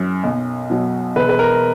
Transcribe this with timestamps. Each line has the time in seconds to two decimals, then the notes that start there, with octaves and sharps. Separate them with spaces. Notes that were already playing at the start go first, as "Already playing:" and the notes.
Already playing: F#2
0.24 B1
0.70 B2 F#3
1.16 E1 B4
1.29 B4
1.39 A#4